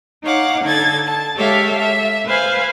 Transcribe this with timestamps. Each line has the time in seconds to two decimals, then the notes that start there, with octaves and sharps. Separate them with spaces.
0.25 D#4 C#5 F5 F#5 D6
0.64 D3 D#4 A4 G#6 A6
1.06 A5
1.36 G#3 G4 A4 C#5 E5 F5
1.79 E5
2.26 B4 C5 F5 G#5 B5